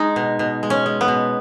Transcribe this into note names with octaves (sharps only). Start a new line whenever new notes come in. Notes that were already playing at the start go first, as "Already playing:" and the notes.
Already playing: G#3 D#4
B2
B2
G#3
C#4
G#3
B3
B2